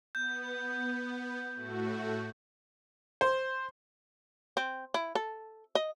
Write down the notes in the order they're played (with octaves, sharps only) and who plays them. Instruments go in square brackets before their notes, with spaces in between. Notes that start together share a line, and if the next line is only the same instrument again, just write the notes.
[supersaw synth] B3 [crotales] G6
[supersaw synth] A2 A3 F#4
[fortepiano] C5
[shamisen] C4
E4
A4
D#5